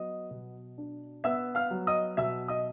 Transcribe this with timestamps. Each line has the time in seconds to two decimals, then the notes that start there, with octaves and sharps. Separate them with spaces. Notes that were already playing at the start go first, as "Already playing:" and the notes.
Already playing: F#3 B3 D#5 D#6
0.31 B2
0.78 D4
1.24 B3 E5 E6
1.55 F5 F6
1.71 F#3
1.87 D#5 D#6
2.17 B2 E5 E6
2.48 D#5 D#6